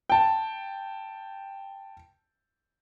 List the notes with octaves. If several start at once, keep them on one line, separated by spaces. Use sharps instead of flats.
G5 A5